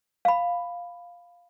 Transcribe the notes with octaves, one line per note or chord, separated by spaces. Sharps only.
F5 B5